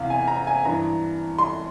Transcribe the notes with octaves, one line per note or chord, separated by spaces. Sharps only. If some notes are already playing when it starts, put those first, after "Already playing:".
Already playing: E2 C3 E3 F5
G#5
A#5
G#5
G2 E3 A#5
C6